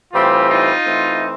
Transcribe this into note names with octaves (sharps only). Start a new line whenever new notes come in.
A2 E3 G3 C4 F4 G4
D#4 F4
E3 A3 C4